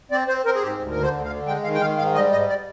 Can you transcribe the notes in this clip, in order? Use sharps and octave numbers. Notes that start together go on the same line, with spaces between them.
C4 D5
C4 C5
C4 A#4
G#4
G#2 G4
D2
A#4
D3
C5
D2
F5
D3
G#3 G5
D#3 F5
G5
D#3 F5
G#2 F5
G3 D#5
G#2 D#5
D5